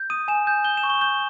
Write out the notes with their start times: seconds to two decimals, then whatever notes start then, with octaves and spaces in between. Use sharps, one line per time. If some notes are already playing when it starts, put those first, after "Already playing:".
Already playing: G6
0.10 D#6 D#7
0.28 G#5 E7
0.47 G6
0.65 G6 G7
0.77 E7
0.83 C#6
0.90 G7
1.01 G6 G7